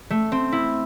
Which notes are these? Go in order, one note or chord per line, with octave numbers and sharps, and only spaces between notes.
A3
C4
E4